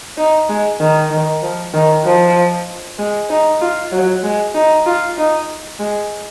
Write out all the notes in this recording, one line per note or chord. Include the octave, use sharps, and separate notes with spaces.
D#4
G#3
D#3
D#3
F3
D#3
F3
G#3
D#4
F4
F#3
G#3
D#4
F4
D#4
G#3